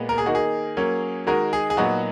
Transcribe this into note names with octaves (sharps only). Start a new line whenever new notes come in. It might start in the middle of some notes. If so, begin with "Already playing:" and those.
Already playing: A#2 G#3 B3
A#4
G#4
D#3 A#3 D#4 F#4
G#4
F#3 A#3 C#4
D#3 G#3 D#4 F#4 A#4
G#4
G#4
A#2 F#3 B3 D#4 F#4